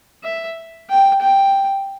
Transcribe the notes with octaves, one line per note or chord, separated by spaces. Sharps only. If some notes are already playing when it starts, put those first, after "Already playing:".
E5
G5
G5